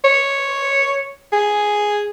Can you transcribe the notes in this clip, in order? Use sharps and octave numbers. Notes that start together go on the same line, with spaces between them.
C#5
G#4